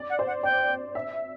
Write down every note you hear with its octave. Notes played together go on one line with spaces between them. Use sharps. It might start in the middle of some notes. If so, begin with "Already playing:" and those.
Already playing: D5
F#5
C5
F#5
D5 G5
E5